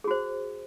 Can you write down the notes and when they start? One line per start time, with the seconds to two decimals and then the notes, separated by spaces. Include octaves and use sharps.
0.04 G#4
0.08 F#4
0.11 C5